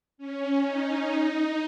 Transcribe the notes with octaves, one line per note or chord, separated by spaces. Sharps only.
C#4
D#4
D#4